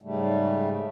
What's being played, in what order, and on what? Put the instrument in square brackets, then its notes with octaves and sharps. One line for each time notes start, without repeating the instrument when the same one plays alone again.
[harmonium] G#2 C#3 G3 A3